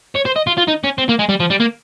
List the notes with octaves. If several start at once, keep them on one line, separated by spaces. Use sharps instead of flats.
C#5
C5
D#5
F4
F4
D#4
C#4
C4
A#3
G#3
G3
F3
G3
A#3